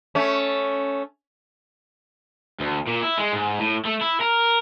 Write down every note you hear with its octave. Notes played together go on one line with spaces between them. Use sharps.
A3 C#4
D2
A#2
E4
G#3
G#2
A2
A3
E4
A#4